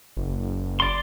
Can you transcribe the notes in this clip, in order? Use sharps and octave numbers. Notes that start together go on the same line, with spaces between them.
F#1
D5 C6